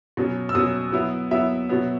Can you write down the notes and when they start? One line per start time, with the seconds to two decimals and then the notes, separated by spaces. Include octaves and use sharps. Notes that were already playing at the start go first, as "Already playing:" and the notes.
0.17 B2 F#3 C#4
0.49 E6
0.55 B2 F#3 C#4 D#6
0.93 F#3 B3 E4
1.31 F#3 B3 E4 E5
1.69 B2 F#3 B3